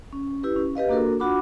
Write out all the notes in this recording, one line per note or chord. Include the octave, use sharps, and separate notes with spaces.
C#4
E4 G4 B4
C#4
G4 B4 D#5 F5
A#3 D4 F#4 A4 A#4
D4 F4 F#4 F#5 B5 D6